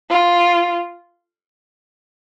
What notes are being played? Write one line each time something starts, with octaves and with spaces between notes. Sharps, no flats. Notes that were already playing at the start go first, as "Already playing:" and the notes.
F4